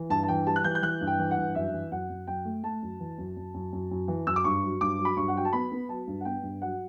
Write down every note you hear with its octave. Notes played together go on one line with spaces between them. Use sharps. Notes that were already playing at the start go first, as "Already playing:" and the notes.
Already playing: E3
G2 A5
A5
E3 G5
G3 A5
F#6
E3 G6
G6
E3 F#6
G2
G5
E3
F#5
G2
F#2 E5
E3
F#2 F#5
F#2
F#2 G5
A3
A3 A5
F#2
E3
F#2
F#2
F#2
F#2
F#2
E3
F#2 E6
D6
G2 C#6
F#3
G2 D6
F#3
B5
G2 C#6
F#5
F#3 G5
A5
B3 B5
B3
F#3 A5
G2
F#5
B3 G5
G2
F#3 F#5